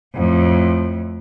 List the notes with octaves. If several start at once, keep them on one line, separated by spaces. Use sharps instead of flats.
F2 A2